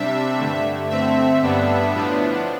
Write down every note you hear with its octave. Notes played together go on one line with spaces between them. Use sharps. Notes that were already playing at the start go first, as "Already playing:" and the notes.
Already playing: C3 G3 D4 E5
G2 D3 A3
D3 A3 C4 E5
G2 D3 G3 B3 D4
A2 F3 B3 D4